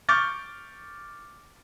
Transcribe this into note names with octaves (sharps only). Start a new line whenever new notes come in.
C#6 D6 F6 G6 A6